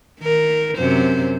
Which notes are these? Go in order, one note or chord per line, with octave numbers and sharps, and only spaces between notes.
D#3 A#4
F#2 C3 C5